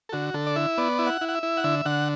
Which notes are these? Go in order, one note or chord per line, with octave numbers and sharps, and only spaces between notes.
A4
D3 F#4
D3 A4
D5
E4 E5
B3 D5
E4
F#5
E4
F#5
E5
E4
F#5
D3 E5
D3 F#5